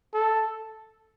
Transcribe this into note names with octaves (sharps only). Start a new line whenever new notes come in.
A4